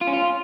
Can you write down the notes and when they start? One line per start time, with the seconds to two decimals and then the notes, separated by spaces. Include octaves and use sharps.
0.01 F4
0.07 C#4
0.13 F4